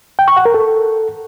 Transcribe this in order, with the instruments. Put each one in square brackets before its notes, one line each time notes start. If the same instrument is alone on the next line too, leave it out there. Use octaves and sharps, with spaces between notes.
[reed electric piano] G5
C#6
F#5
A#4
A4